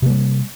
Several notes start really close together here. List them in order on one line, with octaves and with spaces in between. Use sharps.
C3 A#3 G3